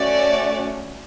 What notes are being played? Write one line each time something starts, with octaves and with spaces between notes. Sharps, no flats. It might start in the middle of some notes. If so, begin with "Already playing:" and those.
Already playing: A3 C#4 F#4 D5